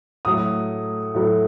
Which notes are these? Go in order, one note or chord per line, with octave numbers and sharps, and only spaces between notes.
A2 F#3 A3 D#6
A2 F#3 A3